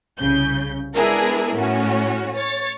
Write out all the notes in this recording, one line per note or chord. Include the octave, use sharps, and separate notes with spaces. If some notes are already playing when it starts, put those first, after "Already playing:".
C2 C#3 G6
G#3 B3 D4 E4 G#4 A#4
A2 C#4 F#4
C#5 A6